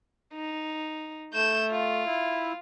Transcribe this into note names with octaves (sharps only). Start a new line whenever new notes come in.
D#4
A3 G6 E7
F4
E4